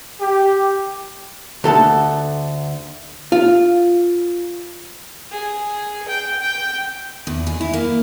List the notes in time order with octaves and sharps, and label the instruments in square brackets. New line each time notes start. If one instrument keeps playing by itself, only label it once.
[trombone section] G4
[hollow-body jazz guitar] D2 A4 F#5 A5
F4
[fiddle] G#4
G5
G5
[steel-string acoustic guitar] E2
G#4
E4
A#3